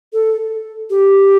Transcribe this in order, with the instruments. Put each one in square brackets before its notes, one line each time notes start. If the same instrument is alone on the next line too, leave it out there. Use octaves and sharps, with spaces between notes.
[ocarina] A4
G4